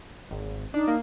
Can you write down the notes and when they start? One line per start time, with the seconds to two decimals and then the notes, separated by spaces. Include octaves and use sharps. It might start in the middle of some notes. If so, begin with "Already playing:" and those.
0.31 G#1
0.74 D4 D#4
0.87 A#3